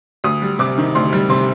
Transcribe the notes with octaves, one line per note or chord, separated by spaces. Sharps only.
D2 D#6
G3
C3 D6
D#3
D2 C6
G3
C3 C6